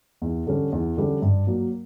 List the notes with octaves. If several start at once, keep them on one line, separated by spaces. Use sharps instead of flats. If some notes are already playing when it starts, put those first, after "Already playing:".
E2
D3 G3 C#4
E2
D3 G3 C#4
G2
F#3 A#3